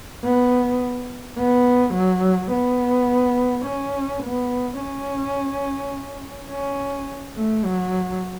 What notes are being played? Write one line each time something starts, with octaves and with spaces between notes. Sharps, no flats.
B3
B3
F#3
B3
C#4
B3
C#4
C#4
A3
F#3